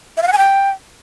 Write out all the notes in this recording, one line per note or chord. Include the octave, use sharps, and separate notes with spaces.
E5
F5
F#5
G#5
G5